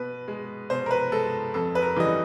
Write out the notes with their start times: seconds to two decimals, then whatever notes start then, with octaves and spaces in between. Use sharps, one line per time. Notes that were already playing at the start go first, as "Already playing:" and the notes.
Already playing: B2 B4
0.28 G#3
0.70 B2 C5
0.86 A#4
0.91 B4
1.12 G#3 A4
1.54 F2 A4
1.75 B4
1.82 A#4
1.96 C#3 E3 G3 D#5